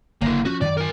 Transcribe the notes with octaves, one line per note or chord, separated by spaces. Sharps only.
F#1 D3 A#3 E4
F3 C#4 F#4
F#2 D#3 D5
A#4 G#5